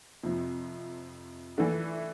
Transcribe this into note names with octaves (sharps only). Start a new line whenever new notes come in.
F2 C3 F3
E3 A3 D4